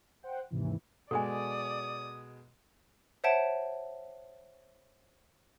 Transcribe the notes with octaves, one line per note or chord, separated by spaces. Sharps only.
C5 F#5 G5
D#2 G#2 C3 E3
B2 G#3 A4 D5 G#5 D#6
C5 C#5 E5 F#5 A5 D7